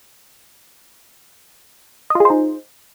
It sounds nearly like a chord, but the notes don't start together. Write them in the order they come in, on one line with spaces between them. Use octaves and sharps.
D#5 F4 G#4 C5 D#4